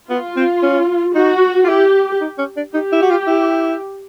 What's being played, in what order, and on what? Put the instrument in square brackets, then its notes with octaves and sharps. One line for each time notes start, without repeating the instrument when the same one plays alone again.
[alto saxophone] B3 [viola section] F4
[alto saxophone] C4
C#4
[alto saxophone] D#4 [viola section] F#4
[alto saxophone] F4
[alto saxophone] E4 [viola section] G4
[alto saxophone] D#4
C#4
D4
[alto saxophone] D#4 [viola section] G4
[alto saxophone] E4
F#4
F4
E4